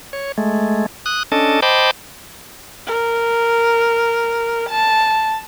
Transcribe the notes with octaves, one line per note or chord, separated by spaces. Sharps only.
C#5
G#3 A3
D#6 F#6
C#4 D4 A4 D#5 A5
C5 D#5 G5 A5 B5 D6
A#4
A5